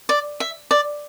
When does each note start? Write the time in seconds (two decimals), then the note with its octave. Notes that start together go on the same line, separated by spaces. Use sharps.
0.09 D5
0.40 E5
0.71 D5